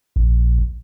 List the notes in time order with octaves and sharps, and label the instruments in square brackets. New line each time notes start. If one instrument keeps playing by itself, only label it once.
[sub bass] A#1